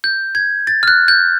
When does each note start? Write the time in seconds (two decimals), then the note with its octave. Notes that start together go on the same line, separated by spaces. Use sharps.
0.04 G6
0.35 G#6
0.67 A6
0.83 F6
0.88 F#6
1.08 G6